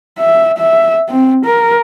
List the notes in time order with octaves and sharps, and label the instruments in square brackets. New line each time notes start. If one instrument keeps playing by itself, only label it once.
[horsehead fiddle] E5
E5
C4
A#4